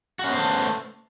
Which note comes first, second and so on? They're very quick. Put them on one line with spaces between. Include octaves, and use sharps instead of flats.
F#4 C#4 B3 C5 A3